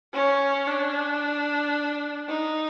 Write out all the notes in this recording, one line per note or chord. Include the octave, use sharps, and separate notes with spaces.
C#4
D4
D#4